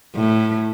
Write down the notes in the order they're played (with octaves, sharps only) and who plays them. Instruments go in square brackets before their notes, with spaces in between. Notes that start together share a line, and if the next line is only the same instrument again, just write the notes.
[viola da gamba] A2